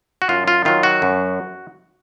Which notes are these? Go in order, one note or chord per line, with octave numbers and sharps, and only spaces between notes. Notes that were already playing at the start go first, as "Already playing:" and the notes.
F#4
F#2 F4
F4
D#3 F#3 F4
F#4
F#2